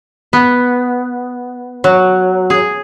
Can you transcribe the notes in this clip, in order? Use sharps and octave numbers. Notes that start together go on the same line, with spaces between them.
B3
F#3
G#4